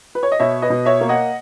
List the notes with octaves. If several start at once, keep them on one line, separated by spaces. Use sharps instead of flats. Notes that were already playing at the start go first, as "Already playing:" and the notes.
B4
C#5
D#5
B2 C#5 E5
B4 D#5
B2
C#5 E5
A#3
D#5 F#5